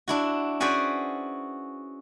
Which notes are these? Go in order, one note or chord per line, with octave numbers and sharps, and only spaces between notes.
D4 E4 F#4
C#4 F#4 G#4 B4 C5 D5